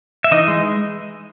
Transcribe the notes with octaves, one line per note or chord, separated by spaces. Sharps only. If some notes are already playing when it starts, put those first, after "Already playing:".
E5
E3 D#4 D#5
G#3